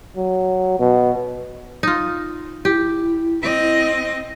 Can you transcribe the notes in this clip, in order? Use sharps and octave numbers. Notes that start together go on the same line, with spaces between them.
F#3
B2
D#4 F4
E4 G4
C4 D#5